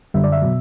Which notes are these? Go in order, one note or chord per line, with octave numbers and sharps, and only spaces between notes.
F#2 D3 G3 E5
D5
E5
B2 F#3